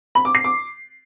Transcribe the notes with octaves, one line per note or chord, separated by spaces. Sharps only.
B5
D6
C7
D6